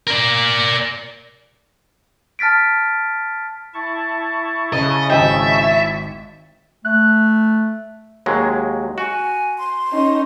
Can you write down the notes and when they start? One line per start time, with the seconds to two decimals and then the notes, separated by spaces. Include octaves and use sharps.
0.07 A#4 D5
2.39 A5 F6 A6 B6 D7
3.74 E4 A5 C#6
4.73 C#3 D#5
5.10 G#1 D#5 E5 G5
6.85 A3 F#6
8.26 D#2 F#3 G#3
8.98 F#4 G#5
9.58 C6
9.92 C#4 D#4